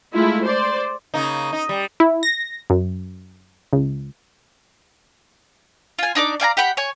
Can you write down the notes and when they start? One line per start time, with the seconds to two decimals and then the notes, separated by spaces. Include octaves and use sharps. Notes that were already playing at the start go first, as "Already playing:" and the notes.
0.13 G#3 A3 E4 F4
0.43 C5 D5
1.14 C#3 A#3 D#4
1.53 D#4
1.69 G3
2.00 E4
2.23 A#6
2.70 F#2
3.73 C#2
5.99 F4 G#5
6.15 D4 D#4 D5 D6
6.40 D5 F5 G#5 A#5
6.57 G4 F#5 G5 B5
6.77 C#5 G#5